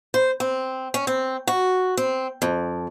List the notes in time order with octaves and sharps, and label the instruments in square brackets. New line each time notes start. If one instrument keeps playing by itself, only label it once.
[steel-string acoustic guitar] C5
C4
C#4
C4
F#4
C4
F2